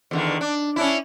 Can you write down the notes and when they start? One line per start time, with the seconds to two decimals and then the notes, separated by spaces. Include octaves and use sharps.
0.11 E2 D3 D#3
0.41 D4
0.76 C#4 D4 E4